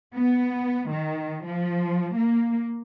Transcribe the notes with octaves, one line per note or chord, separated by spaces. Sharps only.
B3
D#3
F3
A#3